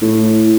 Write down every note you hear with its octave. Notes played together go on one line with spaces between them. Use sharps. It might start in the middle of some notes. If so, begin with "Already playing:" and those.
A2